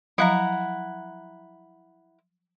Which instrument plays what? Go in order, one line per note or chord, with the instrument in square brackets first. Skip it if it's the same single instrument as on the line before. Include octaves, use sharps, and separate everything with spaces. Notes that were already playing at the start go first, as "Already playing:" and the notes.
[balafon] F3 F#3 F5 [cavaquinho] E4 F#5 A#5